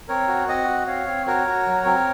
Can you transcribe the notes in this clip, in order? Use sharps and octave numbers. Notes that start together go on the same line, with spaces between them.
C4 A#4 C#5
F#4
C4 D#5 F#5
F#4
C4 C#5 F5
C4
F#4 A#4 C#5
F#4
F#3
C4